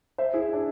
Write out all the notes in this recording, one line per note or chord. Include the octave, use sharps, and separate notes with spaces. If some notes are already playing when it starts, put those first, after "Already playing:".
C5 E5
E4 G#4
D4